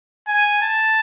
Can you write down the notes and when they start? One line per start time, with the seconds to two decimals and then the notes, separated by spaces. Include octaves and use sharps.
0.28 G#5
0.62 A5